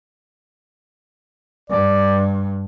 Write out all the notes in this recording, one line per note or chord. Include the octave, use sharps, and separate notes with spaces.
G2 D5